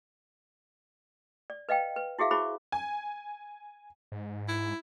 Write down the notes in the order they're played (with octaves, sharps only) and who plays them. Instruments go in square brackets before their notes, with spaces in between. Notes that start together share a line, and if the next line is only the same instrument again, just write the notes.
[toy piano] D5
B4 D#5 F5 G5
B4
E4 F#4 G#4 E5 F5
E4 F#4 G#4 C5 B5 C#6
[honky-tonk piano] G#5
[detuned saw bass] G#2
[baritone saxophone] E4